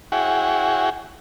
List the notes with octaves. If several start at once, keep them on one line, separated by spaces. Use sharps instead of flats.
E4 F#4 G#4 C#5 F#5 G5